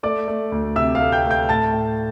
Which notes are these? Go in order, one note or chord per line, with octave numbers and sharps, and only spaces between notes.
A3 D5 D6
A3
D2
C3 E5 E6
F5 F6
A3
G5 G6
A3
G5 G6
A2 A5 A6
A2